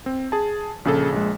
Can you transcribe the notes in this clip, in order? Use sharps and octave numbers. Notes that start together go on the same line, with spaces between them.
C4
G#4 A5
A#1 C#3 G#4 A4
A#1 G#3